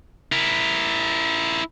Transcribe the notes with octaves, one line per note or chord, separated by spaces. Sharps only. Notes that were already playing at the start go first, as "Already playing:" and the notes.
E4 A#4